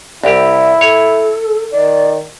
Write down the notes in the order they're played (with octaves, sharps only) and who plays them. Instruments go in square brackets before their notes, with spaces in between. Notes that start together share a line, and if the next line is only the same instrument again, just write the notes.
[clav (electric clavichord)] C2 G4 [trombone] E4
[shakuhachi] A4 [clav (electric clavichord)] C#5
[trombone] D#3 [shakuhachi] D5